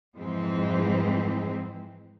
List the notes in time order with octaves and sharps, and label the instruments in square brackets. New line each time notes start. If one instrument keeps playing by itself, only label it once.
[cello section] F2 G#2 E3 G#3 C4